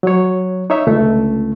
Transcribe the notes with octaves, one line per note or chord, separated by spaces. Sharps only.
F#3 C#5
D#4 C#5 E5
C#2 D3 A3